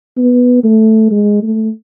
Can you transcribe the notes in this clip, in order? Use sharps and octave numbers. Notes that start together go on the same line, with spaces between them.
B3
A3
G#3
A3